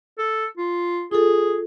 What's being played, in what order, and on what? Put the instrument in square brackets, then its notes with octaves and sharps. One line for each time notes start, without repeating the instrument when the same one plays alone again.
[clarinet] A4
F4
[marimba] F4 A4 [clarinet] G#4